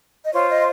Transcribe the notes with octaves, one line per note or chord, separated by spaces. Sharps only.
D#5
F4 C5 C#5
D#5